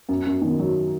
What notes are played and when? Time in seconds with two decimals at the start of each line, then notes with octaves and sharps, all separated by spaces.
0.09 F#2
0.26 F#2
0.42 D#3
0.59 F#3